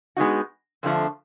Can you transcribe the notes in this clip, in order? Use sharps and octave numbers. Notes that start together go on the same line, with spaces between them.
G#3 B3 D#4 F#4
F2 D3 F3 A3